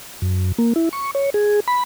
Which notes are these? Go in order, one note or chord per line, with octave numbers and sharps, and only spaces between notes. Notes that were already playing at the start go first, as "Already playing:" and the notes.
F#2
A#3
E4
C#6
C#5
G#4
B5